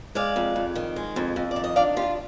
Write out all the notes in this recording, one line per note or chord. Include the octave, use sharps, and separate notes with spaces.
G#3 D5 F5
F2
F2
D#3
G#3
F2
F2
D5
D#3
D#5
D4 D5 F5
F4 G4